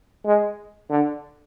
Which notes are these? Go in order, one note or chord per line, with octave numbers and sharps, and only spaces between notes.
G#3
D3